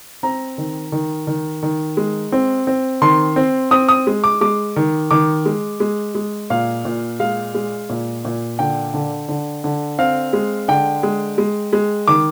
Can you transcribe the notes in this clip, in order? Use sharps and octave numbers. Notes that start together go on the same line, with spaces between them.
C4 A#5
D#3
D#3
D#3
D#3
G#3
C4
C4
D#3 C6
C4
C4 D#6
D#6
G#3
D6
G#3 D6
D#3
D#3 D6
G#3
G#3
G#3
A#2 F5
A#2
G#3 F5
G#3
A#2
A#2
D3 G5
D3
D3
D3
C4 F5
G#3
D3 G5
G#3
G#3
G#3
D#3 D6